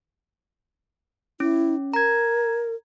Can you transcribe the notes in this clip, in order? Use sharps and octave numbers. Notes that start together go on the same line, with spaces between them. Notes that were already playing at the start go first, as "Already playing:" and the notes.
C#4 E4
A#4 A#5 G#6